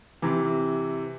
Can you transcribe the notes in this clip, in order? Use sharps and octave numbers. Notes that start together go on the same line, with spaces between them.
C3 E3